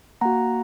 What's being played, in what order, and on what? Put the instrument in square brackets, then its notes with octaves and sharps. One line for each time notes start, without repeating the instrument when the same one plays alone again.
[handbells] A#3 F#4 F#5 A#5